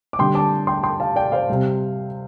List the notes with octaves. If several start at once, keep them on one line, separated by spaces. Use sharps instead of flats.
D6
D3 G3 G5 C6
A5 D6
G5 C6
G5 C6
F5 A5
D5 G5
C5 F5
C3 G3